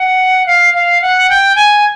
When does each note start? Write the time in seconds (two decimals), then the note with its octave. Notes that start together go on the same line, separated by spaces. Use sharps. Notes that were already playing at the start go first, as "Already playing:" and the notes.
Already playing: F#5
0.46 F5
0.74 F5
1.02 F#5
1.30 G5
1.56 G#5